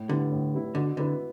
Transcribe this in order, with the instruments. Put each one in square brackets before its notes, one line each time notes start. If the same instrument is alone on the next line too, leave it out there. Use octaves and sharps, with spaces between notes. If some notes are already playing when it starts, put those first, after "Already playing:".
Already playing: [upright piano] A2
[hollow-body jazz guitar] D3 [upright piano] G3 B3 E4
[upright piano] A2
G3 B3 E4
[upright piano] B2 [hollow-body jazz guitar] D3
[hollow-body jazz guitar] D3 [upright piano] B3 E4 B4